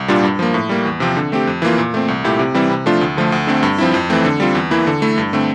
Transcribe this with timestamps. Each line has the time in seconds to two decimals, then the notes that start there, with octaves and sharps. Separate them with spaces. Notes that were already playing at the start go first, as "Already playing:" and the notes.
Already playing: C2
0.08 A#2 G3 D4 F4
0.23 G2
0.39 F3 A#3
0.54 A2
0.69 G3 A#3
0.85 E2
1.00 C3 F3 C4
1.17 D3
1.32 A3 C4 G4
1.47 F2
1.62 E3 A#3 F4
1.78 A#2
1.94 A3 C4
2.08 C2
2.24 A#2 A3 E4 G4
2.39 C3
2.54 E3 G3 C4 E4
2.70 C3
2.86 F3 A3 D4 F4
3.01 D2
3.17 D3 F3 A3
3.32 D2
3.47 D3 A3 C4
3.63 G2
3.78 F3 C4 E4
3.94 F2
4.10 E3 A3 C4
4.25 D3
4.40 G3 C4 F4
4.55 E2
4.71 E3 A#3 E4
4.87 D3
5.02 A3 E4
5.18 G2
5.33 D3 A3 C4